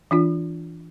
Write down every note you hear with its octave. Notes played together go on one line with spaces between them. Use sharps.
E3 D4 F4